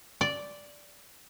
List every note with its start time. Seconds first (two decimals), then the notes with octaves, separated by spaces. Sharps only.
0.21 D5